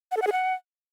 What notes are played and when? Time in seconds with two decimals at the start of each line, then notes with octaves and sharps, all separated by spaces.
0.12 F#5
0.17 A4
0.22 F#5
0.27 G#4
0.32 F#5